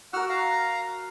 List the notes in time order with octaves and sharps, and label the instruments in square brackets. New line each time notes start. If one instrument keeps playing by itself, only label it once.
[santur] F#4 A#4 [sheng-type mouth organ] F#5 E6 F6
[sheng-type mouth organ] F5 A#5